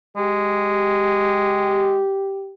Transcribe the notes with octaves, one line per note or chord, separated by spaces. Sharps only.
G#3 G4